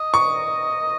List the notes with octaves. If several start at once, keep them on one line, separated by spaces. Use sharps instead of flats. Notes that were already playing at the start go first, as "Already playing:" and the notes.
Already playing: D#5
C#6